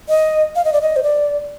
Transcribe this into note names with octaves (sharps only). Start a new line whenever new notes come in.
D#5
F5
D#5
D5
D#5
C5
D5